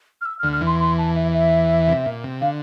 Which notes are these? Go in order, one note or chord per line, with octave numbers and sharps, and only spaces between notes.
F6
E6
F6
D2 D3
F6
E2 E3
C6
C6
A5
E5
E5
C3
A#2
C3
D3 F5